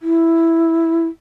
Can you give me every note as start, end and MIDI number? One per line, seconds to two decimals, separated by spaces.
0.01 1.07 64